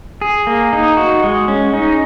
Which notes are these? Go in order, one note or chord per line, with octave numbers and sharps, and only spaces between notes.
G#4
A#3
D#4
F#4
G#3
C#4
D#4